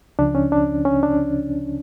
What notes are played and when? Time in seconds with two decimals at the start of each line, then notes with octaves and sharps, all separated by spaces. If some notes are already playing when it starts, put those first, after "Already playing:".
0.19 C#2 C#3 F3 D4
0.35 C#4
0.52 D4
0.85 C#4
1.03 D4